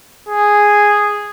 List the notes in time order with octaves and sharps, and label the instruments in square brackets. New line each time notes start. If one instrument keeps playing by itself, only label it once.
[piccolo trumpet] G#4